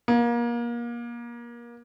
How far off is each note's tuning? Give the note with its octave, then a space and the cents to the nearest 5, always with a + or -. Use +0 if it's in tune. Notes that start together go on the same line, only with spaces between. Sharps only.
A#3 +30